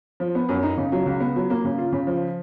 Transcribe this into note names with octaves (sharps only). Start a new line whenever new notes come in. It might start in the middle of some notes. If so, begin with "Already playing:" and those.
F3
B3
F#2
D#4
C#3
F#3
C#2
B3
F#3
A#3
C#3
F4
C#3
F3